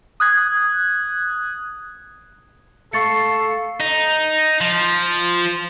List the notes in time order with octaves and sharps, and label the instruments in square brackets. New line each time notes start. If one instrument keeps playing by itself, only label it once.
[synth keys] D#6 F#6 G#6
[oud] A3 [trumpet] A4 [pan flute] F5 [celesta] C#6 A6 C#7
[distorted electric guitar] D#4
F3